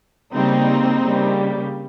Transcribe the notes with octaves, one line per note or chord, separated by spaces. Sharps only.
C#3 G3 A#3 C4 D#4
C#3 G3 A#3